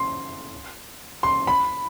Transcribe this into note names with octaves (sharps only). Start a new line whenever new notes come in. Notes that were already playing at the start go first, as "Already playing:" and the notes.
Already playing: C6
C6
B5